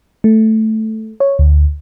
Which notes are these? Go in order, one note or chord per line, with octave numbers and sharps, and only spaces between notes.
A3
C#5
D2